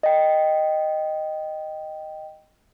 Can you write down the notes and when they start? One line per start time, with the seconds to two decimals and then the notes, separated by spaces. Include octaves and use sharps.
0.03 D#5 G5